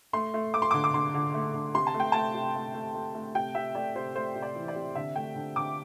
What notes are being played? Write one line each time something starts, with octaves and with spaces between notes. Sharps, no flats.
A3 C6
A3
A3 D6
C6
D3 D6
D6
D3 C6
D3
A3
D3
C3 C6
A5
A3
G5
A3 A5
C3
A3
A3
A3
A3
C3 G5
C3 E5
A3 D5
C3 C5
A3 C5
C3
D5
E3
D5
C3
D3 E5
A3 G5
D3
D3 D6